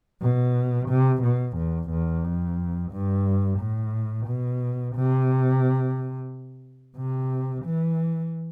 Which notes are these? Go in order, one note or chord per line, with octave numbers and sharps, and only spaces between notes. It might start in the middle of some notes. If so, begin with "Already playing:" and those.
B2
C3
B2
E2
E2
F2
G2
A2
B2
C3
C3
E3